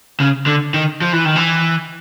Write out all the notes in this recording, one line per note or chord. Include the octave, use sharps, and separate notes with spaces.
C#3
D3
D#3
F3
E3
D#3
E3